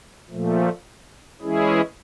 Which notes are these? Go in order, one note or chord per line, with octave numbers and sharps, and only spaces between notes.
A#2 F3 A3
E3 G#3 C#4 E4 G#4